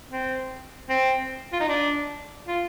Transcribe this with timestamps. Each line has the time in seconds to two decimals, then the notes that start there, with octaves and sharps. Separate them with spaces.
0.11 C4
0.89 C4
1.53 F4
1.61 D#4
1.69 D4
2.47 F4